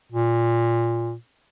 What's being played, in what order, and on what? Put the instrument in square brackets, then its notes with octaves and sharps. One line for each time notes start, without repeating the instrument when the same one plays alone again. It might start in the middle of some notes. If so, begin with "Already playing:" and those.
[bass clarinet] A#2